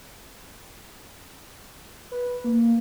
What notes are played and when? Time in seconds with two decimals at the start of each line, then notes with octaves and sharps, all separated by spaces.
2.12 B4
2.44 A#3